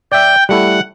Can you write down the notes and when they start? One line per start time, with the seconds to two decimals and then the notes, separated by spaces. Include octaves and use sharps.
0.12 D5 E5 G5
0.49 G3 A3 E4 F#5